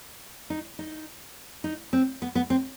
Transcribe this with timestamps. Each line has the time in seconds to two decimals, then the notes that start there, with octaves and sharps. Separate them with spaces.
0.50 D#4
0.79 D#4
1.64 D#4
1.93 C4
2.22 B3
2.35 B3
2.50 C4